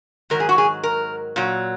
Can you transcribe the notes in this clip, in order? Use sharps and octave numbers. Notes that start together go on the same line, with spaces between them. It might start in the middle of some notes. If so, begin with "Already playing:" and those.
G#2 D#3 F#3 A#4
G#4
F#4
G#4
A#4
A#2 F#3